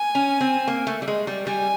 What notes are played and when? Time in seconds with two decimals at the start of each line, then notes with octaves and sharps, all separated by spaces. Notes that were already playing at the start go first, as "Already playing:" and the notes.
Already playing: G#5
0.15 C#4
0.41 C4
0.68 A#3
0.87 A3
1.02 G3
1.08 G#3
1.27 G3
1.46 G3 G#5